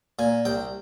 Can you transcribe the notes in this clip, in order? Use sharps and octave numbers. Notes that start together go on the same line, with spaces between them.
A#2 G#5
C2 G5